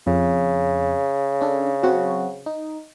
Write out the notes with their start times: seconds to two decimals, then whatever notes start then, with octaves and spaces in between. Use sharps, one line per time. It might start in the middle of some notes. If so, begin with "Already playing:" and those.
0.07 F2 C#3
1.41 C#4 D4 A4
1.83 F#3 C4 F#4
2.46 D#4